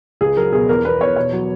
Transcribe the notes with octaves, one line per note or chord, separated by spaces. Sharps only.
C#2 G#4
F#3 A#4
B2 G#4
E2 A#4
E2 B4
E2 C#5
B2 C#5
F#3